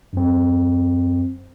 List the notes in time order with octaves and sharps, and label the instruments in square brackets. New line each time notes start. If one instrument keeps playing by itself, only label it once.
[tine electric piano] F#2 C4